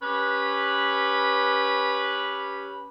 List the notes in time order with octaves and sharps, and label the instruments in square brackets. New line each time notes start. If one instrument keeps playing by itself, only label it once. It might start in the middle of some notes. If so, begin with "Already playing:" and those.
[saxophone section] C#4 G4 B4